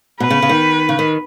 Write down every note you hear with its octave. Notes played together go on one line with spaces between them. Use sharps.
B2 B4
C#3
C#3
D#3
C#3
D#3